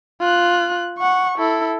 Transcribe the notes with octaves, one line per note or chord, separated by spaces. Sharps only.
F4 F#6
F#5 C#6
E4 A4